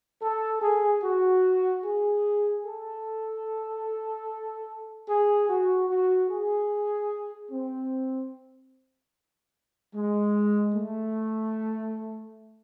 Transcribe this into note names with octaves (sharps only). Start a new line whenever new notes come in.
A4
G#4
F#4
G#4
A4
G#4
F#4
F#4
G#4
C4
G#3
A3